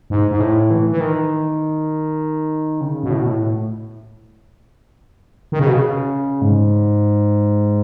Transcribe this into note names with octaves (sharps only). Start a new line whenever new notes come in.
G#2
G#2
A2
E3
E3
D#3
C#3
B2
A2
B2
A2
D#3
C#3
B2
C#3
G#2